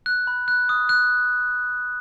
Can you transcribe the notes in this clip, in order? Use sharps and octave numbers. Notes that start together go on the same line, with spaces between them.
F#6
B5
F#6
D#6
F#6